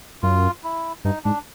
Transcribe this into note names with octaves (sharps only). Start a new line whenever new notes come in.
F#2 F4
E4
G2 D#4
G#2 D4